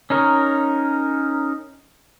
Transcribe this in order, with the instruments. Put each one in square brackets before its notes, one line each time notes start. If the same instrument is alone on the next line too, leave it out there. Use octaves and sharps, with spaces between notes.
[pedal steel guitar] C#4 D#4 A#4 C#5